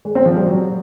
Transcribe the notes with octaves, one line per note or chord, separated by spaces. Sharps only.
G#3
C4
F3
G3
F#3